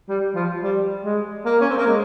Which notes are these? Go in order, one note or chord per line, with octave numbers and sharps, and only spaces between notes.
G3
F3
G3
G#3
A#3
C#4
C4
A#3
G#3